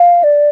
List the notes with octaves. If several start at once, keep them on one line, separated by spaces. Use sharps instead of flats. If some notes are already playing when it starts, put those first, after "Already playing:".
Already playing: F5
D5